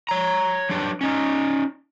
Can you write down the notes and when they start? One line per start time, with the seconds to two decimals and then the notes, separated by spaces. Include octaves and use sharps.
0.09 C#5 A#5
0.69 F#3 D4 G4 B4
1.01 C#4 D#4